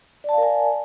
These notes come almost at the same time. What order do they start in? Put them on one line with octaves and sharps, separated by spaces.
D5 A5 F5 A#4 G#5